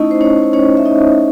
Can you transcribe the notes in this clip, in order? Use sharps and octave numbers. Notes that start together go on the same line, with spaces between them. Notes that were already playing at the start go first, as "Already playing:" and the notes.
Already playing: A3 C#4 D#4 E4 D#5
C5
C#4 C#5
C5
C#4 C#5
E5
D#4 D#5